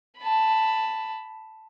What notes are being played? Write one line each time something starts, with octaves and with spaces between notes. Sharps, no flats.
A5 B5